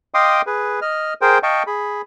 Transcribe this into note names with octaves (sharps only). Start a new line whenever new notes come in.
D#5 F5 G5 C6 D6 D#6
G#4 B4
D#5 F6
G#4 A#4 C5 G5
D#5 F5 G5 A5 C#6
G#4 B5